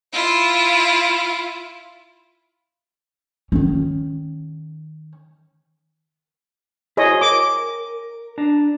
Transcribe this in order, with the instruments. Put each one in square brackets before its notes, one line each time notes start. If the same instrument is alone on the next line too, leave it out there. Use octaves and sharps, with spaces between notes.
[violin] E4 F4
[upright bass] D#3 C#4
[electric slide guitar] E4 F#4 C5 [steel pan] G#4 C#5 D#5
[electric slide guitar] A#4 [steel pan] D6
[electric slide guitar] D4 A5 A#5